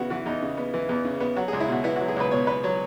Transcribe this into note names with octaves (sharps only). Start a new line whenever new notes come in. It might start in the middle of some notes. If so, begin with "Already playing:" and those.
Already playing: E2 C#3 B3 E4 F#4
E3 F#4
E2 D#4
C#3
B3
E3
E2
C#3
B3
F#3 F#4
C#2 G#4
E4
B2 F#4
B3 E4
F#3 F#4
G#4
C#2 B4
B2 C#5
B3 B4
F#3 C#5